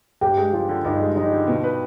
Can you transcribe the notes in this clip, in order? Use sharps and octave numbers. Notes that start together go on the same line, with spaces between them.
G2 G4
G#3
F3 F4
D3
G2 D#4
G#3
F3 D#4
D3
B2
B4